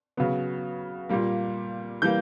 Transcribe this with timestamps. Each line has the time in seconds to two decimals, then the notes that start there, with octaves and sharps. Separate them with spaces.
0.17 C#3 F#3 B3
1.09 A#2 G3 A#3
2.02 E3 G3 A#3 G6